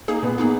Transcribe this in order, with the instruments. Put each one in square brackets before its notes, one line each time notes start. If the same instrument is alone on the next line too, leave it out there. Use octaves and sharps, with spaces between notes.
[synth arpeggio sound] A#3 D#4 G#4
[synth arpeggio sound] A#2 [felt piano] B3
[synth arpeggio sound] A#3 D#4 G#4